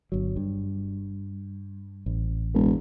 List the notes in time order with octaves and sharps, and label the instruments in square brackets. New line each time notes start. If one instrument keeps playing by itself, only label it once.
[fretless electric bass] G1 F#3
G2
A1
[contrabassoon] E1